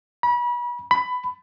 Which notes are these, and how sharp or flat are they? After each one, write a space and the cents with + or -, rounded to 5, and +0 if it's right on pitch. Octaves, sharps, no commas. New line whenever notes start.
B5 -35
B5 +15